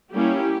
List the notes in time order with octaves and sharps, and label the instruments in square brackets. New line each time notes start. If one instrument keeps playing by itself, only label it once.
[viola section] G3 A#3 C#4 E4 G4